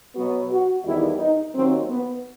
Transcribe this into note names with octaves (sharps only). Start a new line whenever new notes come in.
B2 F#3 B3 F#4
F#4
E2 D#3 G3 B3 E4
D#4
D#2 D#3 F#3 C4
B3